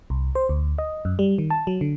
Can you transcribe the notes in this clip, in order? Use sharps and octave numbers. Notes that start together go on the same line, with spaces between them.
C2
C5
D2
D#5
F#2
G3
D#3
A5
F#3
D3